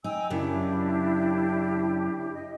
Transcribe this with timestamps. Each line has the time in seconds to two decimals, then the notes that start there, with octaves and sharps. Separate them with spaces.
0.04 D#4 G5 G#5 E6
0.30 F#2 C#3 D4 E4 G4
2.34 D#5